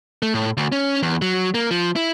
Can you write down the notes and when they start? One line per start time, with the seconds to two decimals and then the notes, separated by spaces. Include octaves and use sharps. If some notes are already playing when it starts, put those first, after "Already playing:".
0.22 A3
0.34 A2
0.57 D2
0.72 C#4
1.03 E2
1.22 F#3
1.54 A#3
1.71 F3
1.96 E4